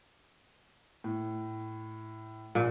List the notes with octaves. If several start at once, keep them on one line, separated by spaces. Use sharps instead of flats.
A2
A#1 A#2